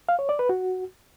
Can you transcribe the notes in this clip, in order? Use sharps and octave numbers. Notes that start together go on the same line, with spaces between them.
F5
C#5
D5
B4
F#4